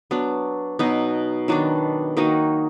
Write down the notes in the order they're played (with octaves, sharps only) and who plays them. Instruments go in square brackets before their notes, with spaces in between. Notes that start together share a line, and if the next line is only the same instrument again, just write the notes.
[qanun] F#3 B3 D4
B2 F#3 B3 D#4
D#3 F#3 B3 D4
D#3 A#3 D#4 F#4